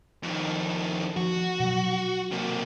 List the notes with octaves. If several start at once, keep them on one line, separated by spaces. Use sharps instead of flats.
F2 D#3
F3 F#4
B2 F#3
C3 A#3